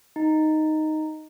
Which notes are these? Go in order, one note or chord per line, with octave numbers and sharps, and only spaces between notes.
D#4